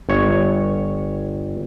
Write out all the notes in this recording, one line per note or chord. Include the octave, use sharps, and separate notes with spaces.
G1 C#5